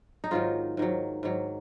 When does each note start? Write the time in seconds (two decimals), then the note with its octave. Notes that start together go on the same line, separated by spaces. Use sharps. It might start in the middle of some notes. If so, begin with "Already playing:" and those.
0.24 D#4
0.31 G#2 D#3 F#3 F4
0.77 G#2 D#3 F#3
1.23 G#2 D#3 F#3